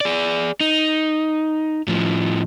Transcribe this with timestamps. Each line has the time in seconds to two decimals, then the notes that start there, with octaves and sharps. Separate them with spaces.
0.01 G#4 D5
0.61 D#4
1.88 A2 F3